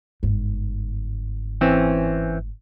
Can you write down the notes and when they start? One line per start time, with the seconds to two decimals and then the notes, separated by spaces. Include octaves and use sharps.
0.23 G1 G#2
1.61 E3 C4 C#4